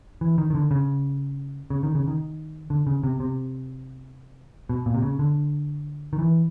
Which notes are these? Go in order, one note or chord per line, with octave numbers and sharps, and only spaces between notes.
E3
D#3
D#3
D3
C#3
C#3
D#3
C#3
D#3
D3
C#3
C3
C3
B2
A#2
C3
C#3
D3
D#3
E3